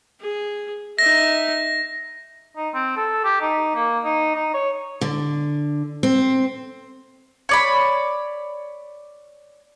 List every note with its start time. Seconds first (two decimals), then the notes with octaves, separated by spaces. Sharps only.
0.21 G#4
0.99 D#4 E5 A#6
2.57 D#4
2.74 C4
2.96 A4
3.24 G4
3.41 D#4
3.75 A#3
4.04 D#4
4.35 D#4
4.54 C#5
5.01 D3
6.03 C4
7.49 C#5 D5 B5